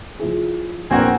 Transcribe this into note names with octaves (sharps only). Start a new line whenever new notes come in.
F3 E4 G#4
A#1 E2 C4 F#4 A#4 G#5